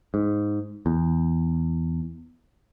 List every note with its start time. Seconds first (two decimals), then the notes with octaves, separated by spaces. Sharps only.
0.14 G#2
0.86 E2